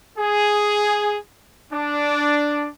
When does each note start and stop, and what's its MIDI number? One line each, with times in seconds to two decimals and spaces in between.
0.18 1.17 68
1.72 2.68 62